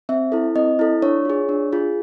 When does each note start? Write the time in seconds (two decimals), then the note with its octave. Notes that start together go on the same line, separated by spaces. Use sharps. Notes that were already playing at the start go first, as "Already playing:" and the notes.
0.09 C4 E5
0.32 E4 A4
0.56 C4 D#5
0.79 E4 A4
1.02 D4 C#5
1.25 F4 G#4
1.49 D4
1.73 F4 G#4